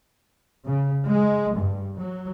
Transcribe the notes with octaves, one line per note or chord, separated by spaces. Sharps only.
C#3
G#3
G2
F#3